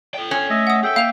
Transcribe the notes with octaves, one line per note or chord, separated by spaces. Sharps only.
A4 G5
C#4
A3 D#5 E5
F#5 D#6
G#4 A4 E5 G5
A#3 F5 F7